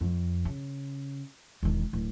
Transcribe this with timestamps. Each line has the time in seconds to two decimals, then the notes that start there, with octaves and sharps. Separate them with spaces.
0.01 F2
0.45 C#3
1.63 E1 D#3
1.93 D1